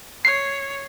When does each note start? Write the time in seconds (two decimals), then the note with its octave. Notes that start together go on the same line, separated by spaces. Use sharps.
0.25 C#5 C7